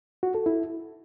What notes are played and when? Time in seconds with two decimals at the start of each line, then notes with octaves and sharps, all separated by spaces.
0.23 F#4
0.34 A4
0.46 E4